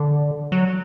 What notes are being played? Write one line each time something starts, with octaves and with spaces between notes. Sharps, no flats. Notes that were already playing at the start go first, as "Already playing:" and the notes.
Already playing: D3
F#3